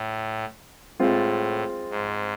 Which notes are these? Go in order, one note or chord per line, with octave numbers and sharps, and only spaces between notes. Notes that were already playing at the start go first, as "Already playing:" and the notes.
Already playing: A2
A2 G#3 C4 F4
G#2